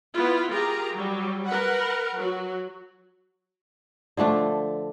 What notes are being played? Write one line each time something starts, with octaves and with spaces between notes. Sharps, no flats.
B3 E4 F4
F4 G4 G#4 A#4 A#5
F#3 G3
A#4 B4 F#5
F#3 F#4
D3 F3 A3 D4